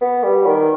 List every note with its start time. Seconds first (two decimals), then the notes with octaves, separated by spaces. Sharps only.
0.01 B3
0.23 G3
0.46 D#3